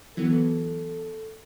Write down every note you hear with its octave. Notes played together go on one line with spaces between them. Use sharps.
E3 F#3 B3 A4